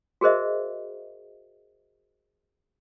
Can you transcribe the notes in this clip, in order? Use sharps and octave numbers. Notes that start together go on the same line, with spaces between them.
F#4 G#4 A#4 C5 D#5 E5